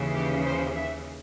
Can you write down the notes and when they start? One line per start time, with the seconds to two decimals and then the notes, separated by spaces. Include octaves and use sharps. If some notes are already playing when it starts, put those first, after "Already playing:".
Already playing: D#2 C#3 E3
0.13 G4
0.44 C5
0.75 E5